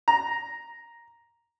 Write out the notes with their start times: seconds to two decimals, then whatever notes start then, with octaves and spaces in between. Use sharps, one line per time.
0.08 A#5